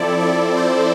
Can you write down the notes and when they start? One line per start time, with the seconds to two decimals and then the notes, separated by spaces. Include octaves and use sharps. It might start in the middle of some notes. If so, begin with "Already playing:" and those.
Already playing: F3 C4 E4 A4 D5
0.20 D5
0.57 C5